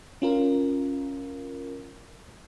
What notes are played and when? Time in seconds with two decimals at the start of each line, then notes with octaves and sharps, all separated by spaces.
0.22 C#4 F4 A#4